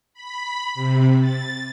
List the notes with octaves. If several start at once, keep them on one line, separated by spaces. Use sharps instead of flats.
B5
C3
A6